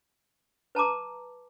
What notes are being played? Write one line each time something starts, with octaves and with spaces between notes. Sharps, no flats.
B4 A5 A#5 D6